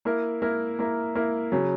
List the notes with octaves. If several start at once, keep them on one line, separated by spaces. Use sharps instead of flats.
A#3 E4 A#4
A#3 E4 A#4
A#3 E4 A#4
A#3 E4 A#4
C#3 F#3